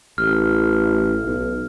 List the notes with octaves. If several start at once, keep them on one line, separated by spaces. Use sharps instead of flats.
A1 F6
B1